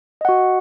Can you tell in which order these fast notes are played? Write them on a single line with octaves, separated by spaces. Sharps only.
D#5 F#5 F#4